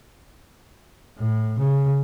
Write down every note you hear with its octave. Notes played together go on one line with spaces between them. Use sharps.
A2
C#3